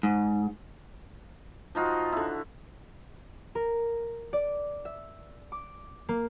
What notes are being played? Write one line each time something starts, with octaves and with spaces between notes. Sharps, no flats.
G#2
F3 D#4 F4 F#4
D3 E4
A#4
D5
E5
D6
A#3